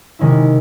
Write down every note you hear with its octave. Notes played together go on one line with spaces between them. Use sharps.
C3 D#3 G#3 C#4 E4